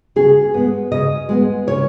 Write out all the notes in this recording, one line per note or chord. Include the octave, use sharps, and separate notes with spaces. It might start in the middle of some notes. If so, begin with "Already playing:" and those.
C#3 G#4
G#3 B3
C#3 D#5
G#3 B3
C#3 C#5